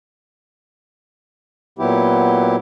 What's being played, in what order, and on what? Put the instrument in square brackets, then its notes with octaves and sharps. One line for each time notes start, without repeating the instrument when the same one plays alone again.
[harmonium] A#2 F#3 B3 E4 G4